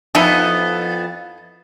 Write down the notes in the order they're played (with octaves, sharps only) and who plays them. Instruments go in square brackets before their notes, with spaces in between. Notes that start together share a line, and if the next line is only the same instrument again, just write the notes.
[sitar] F2 B3 [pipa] D#4 E4 A4